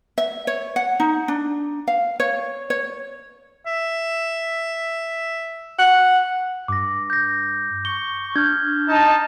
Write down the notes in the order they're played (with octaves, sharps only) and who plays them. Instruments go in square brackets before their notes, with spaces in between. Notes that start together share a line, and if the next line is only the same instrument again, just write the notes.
[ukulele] E5
C#5
F#5
D#4
D4
F5
C#5
C#5
[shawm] E5
[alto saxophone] F#5
[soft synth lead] G2 [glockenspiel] D6 A#6
[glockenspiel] G6 A#6
[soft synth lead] C#6 [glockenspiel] G7
[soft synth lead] D4 [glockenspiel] F6 G6 G#6
[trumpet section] D#4 A5